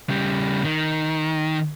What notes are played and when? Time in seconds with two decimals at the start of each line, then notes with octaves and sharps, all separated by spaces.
0.09 C#3 G3
0.64 D#3